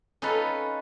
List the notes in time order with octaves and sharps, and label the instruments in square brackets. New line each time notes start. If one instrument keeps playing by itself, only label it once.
[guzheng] C#4 D#4 F4 A4 B4